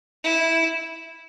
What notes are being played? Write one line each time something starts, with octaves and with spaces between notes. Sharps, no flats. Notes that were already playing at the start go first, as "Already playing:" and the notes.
E4